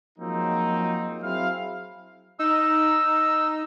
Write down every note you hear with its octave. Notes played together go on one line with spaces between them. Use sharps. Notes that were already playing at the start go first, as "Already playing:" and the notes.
F3 F#3 G#3 A#3 C4 D#4
F#3 C4 E4 G#4 F5
D#4 E6